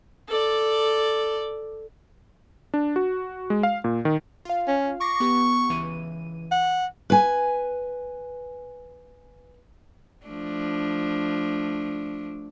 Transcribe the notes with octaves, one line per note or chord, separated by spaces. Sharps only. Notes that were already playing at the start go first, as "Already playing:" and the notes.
A4 D5
D4
F#4
G#3
F5
A#2
D#3
F4 F5
C#4
C#6 D6 A#6 C7
B3 G4
C#2 E3 D#7
F#5
B4 G#5
F3 A3 D4